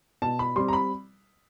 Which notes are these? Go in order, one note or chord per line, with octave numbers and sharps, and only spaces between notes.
B2 A5
B5
G3 C4 C6
A#5
B5